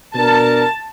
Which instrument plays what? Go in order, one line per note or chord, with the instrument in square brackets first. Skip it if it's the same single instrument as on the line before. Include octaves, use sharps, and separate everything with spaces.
[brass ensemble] B2 D4 A#4 [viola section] A5